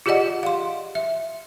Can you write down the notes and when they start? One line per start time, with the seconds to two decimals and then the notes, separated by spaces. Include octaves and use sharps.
0.06 F4 G4 G#4 D5 D#5 F#5
0.43 F5 C6
0.95 E5